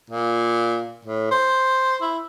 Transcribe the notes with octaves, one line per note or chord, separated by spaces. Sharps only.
A#2
A2
C5
E4